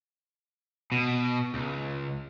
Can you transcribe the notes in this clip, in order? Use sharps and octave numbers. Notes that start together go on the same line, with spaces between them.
B2
C#2